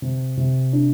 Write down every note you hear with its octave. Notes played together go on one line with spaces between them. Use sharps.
C3
C3
D4